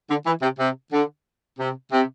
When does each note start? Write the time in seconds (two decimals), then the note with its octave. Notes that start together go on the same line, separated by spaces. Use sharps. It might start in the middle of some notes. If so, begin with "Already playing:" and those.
0.10 D3
0.26 E3
0.42 C3
0.59 C3
0.93 D3
1.59 C3
1.92 C3